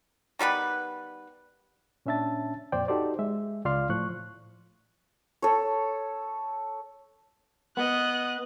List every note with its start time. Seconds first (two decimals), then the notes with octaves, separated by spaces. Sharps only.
0.39 D#3 G3 B3 B4
2.06 A#2 C#4 D4 E5 A5 A6
2.72 F2 A#2 C5 D5 G5
2.88 D#4 F#4 G4 A4 C5 D5
3.19 G#3 E5
3.65 C#2 F4 D5 F5 C6 F6
3.89 A2 F3 C#6 F#6
5.42 A4 C#5
7.77 B3 D#5 F#6